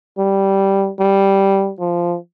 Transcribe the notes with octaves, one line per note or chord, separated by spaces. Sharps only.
G3
G3
F3